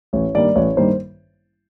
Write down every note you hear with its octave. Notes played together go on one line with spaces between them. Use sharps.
A1 C#5
G2 D#3 G3 A#3 D5
A1 C#5
G2 D#3 G3 A#3 C5